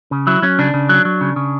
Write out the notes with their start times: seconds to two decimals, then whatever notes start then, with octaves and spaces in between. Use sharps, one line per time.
0.11 C#3
0.27 F#3 E4
0.42 F#3 C#4
0.59 C#3 D4
0.74 C#3
0.89 F#3
1.05 F#3
1.21 C#3
1.36 C#3